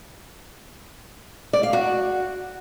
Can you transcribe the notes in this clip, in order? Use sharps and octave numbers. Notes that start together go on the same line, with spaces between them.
D5
F5
F#4